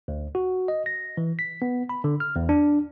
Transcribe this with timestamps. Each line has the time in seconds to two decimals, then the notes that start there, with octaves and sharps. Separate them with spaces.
0.08 D2
0.35 F#4
0.68 D#5
0.86 A#6
1.17 E3
1.39 B6
1.62 B3
1.89 B5
2.04 D3
2.20 F6
2.36 E2
2.49 D4